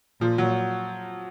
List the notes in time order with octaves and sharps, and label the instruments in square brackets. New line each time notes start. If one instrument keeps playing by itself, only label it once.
[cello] A#2 [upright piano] F3
[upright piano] F#3